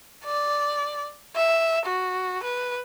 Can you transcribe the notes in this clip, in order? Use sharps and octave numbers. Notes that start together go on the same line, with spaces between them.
D5
E5
F#4
B4